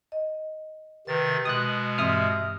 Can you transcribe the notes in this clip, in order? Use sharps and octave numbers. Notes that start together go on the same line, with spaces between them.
D#5
C3 D#3 B4 A6
B2 G#3 D#6 F#6
G2 E3 C4 E5 D#6 F6